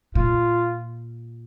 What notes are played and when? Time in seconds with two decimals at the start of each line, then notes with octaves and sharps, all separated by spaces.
0.15 A#2 F4